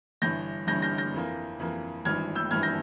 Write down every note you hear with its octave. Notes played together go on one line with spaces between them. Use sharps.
G1 G2 E3 G6 A#6
G1 G2 E3 G6 A#6
G6 A#6
G6 A#6
F2 E3 A#3
F2 E3 A#3
G#1 G2 E3 F6 G#6
E6 G6
G#1 G2 E3 F6 G#6
G6 A#6